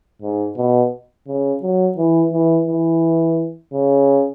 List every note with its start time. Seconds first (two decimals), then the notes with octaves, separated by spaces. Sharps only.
0.22 G#2
0.57 B2
1.28 C#3
1.63 F#3
1.97 E3
2.33 E3
2.68 E3
3.73 C#3